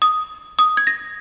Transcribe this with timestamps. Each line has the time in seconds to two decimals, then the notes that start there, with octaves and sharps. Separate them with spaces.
0.02 D#6
0.59 D#6
0.77 G#6
0.87 A#6